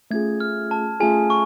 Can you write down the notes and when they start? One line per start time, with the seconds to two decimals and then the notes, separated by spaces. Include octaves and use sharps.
0.11 A3 C#4 F4 G#4 G#6
0.40 F6
0.71 A5
1.00 A3 C#4 F4 G#4 G#5
1.30 C#6